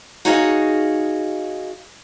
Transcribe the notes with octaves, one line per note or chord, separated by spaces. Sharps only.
D#4 F#4 G#4 C#5 D#5 F5